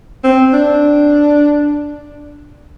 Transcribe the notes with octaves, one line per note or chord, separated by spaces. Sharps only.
C4
D4